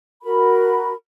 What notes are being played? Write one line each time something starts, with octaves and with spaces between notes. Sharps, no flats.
F#4 A#4 B5